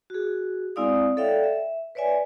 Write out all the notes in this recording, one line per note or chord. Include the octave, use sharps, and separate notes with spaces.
F#4 G#4
G#3 C4 E4 D5 F5 D#6
A4 C#5 D5 E5 F5 G5
E5
B4 C#5 D5 E5 G#5